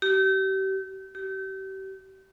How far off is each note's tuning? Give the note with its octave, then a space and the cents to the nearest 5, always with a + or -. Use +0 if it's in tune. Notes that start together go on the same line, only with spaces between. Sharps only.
G4 -35
G4 -35